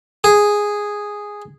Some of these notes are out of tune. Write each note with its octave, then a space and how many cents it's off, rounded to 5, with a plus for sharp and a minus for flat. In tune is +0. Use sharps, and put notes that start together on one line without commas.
G#4 -5